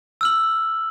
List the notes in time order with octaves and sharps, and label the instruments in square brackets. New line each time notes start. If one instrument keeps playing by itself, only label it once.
[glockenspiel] E6 F6 F#7